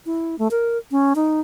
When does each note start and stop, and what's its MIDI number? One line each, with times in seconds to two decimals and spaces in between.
0.06 0.38 64
0.39 0.48 57
0.51 0.78 70
0.91 1.13 61
1.15 1.40 63